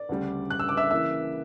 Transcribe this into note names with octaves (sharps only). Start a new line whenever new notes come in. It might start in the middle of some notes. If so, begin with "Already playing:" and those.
Already playing: D5
D2 C#3 G3
F#6
E6
D6
E5 E6
C#3 E3 A#3 E5 E6